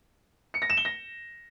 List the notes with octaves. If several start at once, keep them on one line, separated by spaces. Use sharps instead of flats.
C#7
A#6
E7
G7
A#6